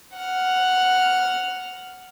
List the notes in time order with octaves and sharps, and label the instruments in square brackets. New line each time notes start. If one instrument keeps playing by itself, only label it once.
[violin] F#5 F6